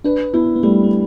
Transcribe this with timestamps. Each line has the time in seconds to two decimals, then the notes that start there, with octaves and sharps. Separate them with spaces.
0.04 D4 B4
0.34 B3 E4
0.56 B3
0.63 G3 A3
0.84 A3